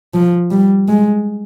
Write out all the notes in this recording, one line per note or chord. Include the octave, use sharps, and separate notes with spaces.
F3
G3
G#3